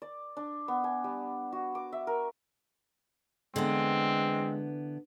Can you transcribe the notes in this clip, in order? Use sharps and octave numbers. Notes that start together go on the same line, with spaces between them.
D5
D4
B3
G#5
G3
F#4
D6
E5
A#4
D3 E3 G#3 B3 C4